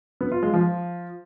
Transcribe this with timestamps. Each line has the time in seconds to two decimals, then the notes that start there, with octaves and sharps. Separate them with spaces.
0.21 B3
0.32 F4
0.43 G#3
0.54 F3